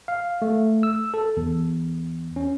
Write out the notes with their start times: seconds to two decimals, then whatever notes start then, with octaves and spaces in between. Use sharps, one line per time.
0.08 F5
0.42 A3
0.83 E6
1.14 A4
1.37 E2
2.36 C#4